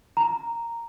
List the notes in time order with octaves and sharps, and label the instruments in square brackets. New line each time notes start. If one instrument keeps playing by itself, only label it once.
[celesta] A#5